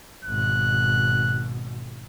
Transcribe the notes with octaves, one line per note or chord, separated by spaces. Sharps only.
G#1 B2 F#6